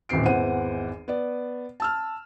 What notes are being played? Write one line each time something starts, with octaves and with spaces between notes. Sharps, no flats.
D#1 A1 D#3 C4 C7 D7
G#1 E2 E3 C5 F#5 D#7
B3 D5
A5 E6 F6